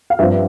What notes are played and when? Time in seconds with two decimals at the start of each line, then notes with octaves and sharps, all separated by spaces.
0.10 F5
0.19 G2 F3 C4 E5